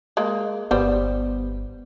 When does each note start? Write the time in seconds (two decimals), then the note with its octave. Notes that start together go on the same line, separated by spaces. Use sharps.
0.17 G#3 A#3
0.71 G1 G3 B3 C5